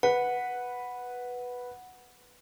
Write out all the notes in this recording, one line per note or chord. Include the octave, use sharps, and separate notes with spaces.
B4 F#5